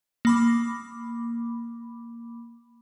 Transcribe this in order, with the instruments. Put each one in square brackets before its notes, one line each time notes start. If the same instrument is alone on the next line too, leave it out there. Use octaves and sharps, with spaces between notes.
[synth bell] A#3 B5 D6